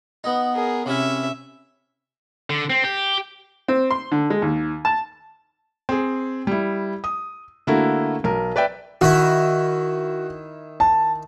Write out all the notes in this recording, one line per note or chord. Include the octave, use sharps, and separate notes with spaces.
B3 D#4
G#4 A#4
C3 C#4 E4 E5 F5
D3
C4
G4
C4
C6
D3
G#3
D#2
A5
C4 G#4
G3 E4
D#6
D3 A3 A#3 E4 F#4
B1 A#4
B4 D5 E5 G5
D#3 E4 F#4
A5